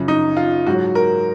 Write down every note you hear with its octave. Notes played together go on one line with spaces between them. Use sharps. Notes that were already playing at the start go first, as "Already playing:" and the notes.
Already playing: F#2 C#3 F3
D#4
F4
G#2 F#3 F#4
A#4